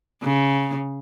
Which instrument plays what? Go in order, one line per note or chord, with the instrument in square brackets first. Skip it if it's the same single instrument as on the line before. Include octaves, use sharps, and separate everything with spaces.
[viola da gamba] C#3